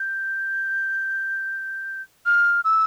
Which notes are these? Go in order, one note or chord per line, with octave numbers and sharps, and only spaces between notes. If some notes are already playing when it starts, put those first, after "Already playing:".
Already playing: G6
F6
E6